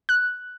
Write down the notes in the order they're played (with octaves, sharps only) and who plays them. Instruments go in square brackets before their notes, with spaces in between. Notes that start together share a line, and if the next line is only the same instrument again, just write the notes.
[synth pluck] F#6